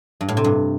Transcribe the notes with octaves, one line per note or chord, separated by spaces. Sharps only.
G2
A2
C3
G2